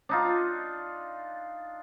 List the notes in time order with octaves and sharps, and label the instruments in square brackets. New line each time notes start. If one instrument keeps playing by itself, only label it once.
[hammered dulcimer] D4 D#4 F4